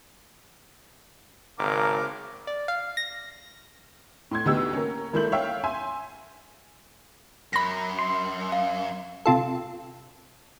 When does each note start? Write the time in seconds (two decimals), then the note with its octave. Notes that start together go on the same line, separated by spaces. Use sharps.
1.59 G#1 C#3 A#4 D6
2.47 D5
2.68 F5
2.97 A#6
4.31 A2 C6 G#6
4.46 D2 B3 D#4 G4 E6
4.73 A#3 C#4
5.13 G#1 A#3 E4 A4 G6 F#7
5.32 C#5 E5 F5 G5
5.64 E5 G#5 C6
7.53 F#2 B5 A#6
7.99 C6
8.52 F5
9.26 C3 F4 A4